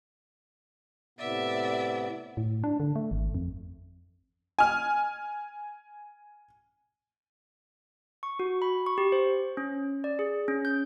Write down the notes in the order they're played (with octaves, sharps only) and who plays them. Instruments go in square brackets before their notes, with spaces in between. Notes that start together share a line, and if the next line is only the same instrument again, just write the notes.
[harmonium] A2 C3 B3 [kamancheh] D5 E5
[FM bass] A2
D4
D3
A3
G#1
F2
[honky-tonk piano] G#5 F6
[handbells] C#6
F#4
B5
C#6
G4
C5
C#4
D5
G#4
C#4
G6